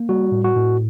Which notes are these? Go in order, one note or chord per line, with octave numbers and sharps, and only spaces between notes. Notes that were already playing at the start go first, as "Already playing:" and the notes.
Already playing: A#3
G3 F#4
A2
F#4
A2